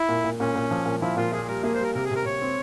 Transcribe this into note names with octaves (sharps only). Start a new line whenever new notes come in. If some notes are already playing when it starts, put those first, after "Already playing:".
Already playing: E4
A#2
A#2
A#2 C#4
A#2
F3
A#2
F3 E4
A#2 F4
A#3 G#4
G3 A#4
A#3 G#4
C5
G3
A#4
C3 A#4
G#4
C3 A#4
C3 C#5
C4